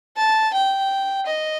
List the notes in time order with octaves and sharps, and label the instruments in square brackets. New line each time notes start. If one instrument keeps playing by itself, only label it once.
[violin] A5
G5
D#5